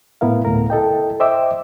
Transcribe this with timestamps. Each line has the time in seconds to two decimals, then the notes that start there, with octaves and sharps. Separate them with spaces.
0.21 A2 B3 E4 A#4 F5
0.45 D2 A2 A#4
0.70 E4 A4 D#5 G5
1.20 C5 D#5 E5 G5 D6 E6